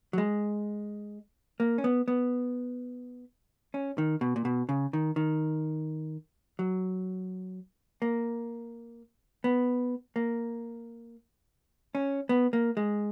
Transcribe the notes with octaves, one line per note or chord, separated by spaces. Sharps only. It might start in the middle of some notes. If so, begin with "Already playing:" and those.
F#3
G#3
A#3
C#4
B3
B3
C#4
D#3
B2
A#2
B2
C#3
D#3
D#3
F#3
A#3
B3
A#3
C#4
B3
A#3
G#3